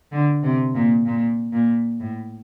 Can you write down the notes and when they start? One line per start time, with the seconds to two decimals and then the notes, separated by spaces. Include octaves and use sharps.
0.12 D3
0.43 C3
0.75 A#2
1.06 A#2
1.53 A#2
2.00 A2